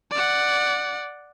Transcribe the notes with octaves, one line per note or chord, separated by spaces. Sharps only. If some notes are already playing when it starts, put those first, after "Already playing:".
D5 F#5